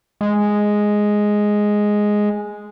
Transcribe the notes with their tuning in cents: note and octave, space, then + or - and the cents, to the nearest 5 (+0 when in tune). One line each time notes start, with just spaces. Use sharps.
G#3 +0